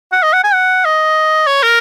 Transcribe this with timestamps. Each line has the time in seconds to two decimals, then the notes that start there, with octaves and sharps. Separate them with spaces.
0.12 F#5
0.23 D#5
0.33 F#5
0.43 G#5
0.54 F#5
0.85 D#5
1.47 C#5
1.63 A#4